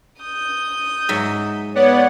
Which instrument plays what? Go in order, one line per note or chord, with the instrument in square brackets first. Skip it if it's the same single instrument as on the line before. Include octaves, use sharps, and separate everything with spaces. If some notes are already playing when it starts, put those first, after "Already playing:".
[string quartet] D#6 G6
[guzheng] G#2 F#3 E5
[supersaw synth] B3 D5 F#5 [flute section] C#5